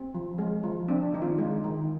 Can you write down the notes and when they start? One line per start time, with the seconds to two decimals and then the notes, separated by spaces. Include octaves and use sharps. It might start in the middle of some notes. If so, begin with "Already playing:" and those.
Already playing: C4
0.15 F3
0.38 G#3
0.63 F3
0.88 C4 D4
1.13 D#3 D#4
1.22 F4
1.38 G#3 D#4
1.64 D#3